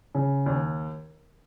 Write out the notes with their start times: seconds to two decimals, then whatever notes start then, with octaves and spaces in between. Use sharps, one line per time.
0.15 C#3
0.46 D#2